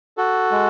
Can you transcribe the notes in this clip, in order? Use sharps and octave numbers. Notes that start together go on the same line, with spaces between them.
F#4 A4
G#3